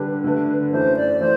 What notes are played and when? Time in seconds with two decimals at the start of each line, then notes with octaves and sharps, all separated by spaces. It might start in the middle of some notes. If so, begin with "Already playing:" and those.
Already playing: D3 G3 D4 B4
0.24 D3 A3 D4
0.72 F#2 E3 A3 C5
0.96 D5
1.20 E3 A3 C5